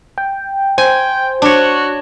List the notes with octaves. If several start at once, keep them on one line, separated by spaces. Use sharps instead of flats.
G5
C5 G5 G#5
D4 F#4 C#5